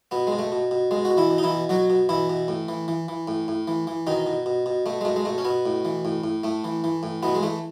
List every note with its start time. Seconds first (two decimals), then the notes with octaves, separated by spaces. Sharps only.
0.11 B2 B3
0.27 G#3
0.32 B2
0.39 A3
0.52 B2
0.71 B2
0.91 B2 G#3
1.05 F#4
1.11 B2
1.17 E3 E4
1.30 B2
1.38 D#4
1.43 E3 E4
1.51 B2
1.69 B2 F#3 F#4
1.90 B2
2.09 B2 E3 E4
2.30 B2
2.48 A2
2.69 E3
2.88 E3
3.08 E3
3.28 A2
3.48 A2
3.68 E3
3.87 E3
4.07 B2 D#3 D#4
4.27 B2
4.46 B2
4.66 B2
4.86 B2 A3
5.01 G#3
5.05 B2 A3
5.16 G#3
5.25 B2 A3
5.38 C#4
5.45 B2 B3
5.66 A2
5.85 E3
6.05 A2
6.24 A2
6.43 A2 A3
6.64 E3
6.84 E3
7.03 A2
7.23 B2 E3 B3
7.35 G#3
7.43 E3 A3